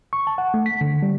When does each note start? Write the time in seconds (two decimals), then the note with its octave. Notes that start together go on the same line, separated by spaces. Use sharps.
0.13 C#6
0.27 A5
0.38 F#5
0.54 A3
0.66 B6
0.81 D3
1.03 G3